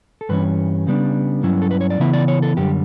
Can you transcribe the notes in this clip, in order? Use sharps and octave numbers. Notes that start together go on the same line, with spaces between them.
A4
G2 E3 G3 C#4 B4
C#3 G3 B3 D4
G2 F#3 C#4 E4
A4
B4
C#5
D5
C#3 E3 B3 E4 E5
D5
C#5
A4
F#2 D3 G3 G4